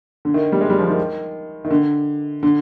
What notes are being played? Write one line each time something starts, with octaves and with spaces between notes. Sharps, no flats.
D3
D#3
G3
G#3
G3
F3
D#3
D#3
D3
D3